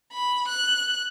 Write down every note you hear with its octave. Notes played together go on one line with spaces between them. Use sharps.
B5
F#6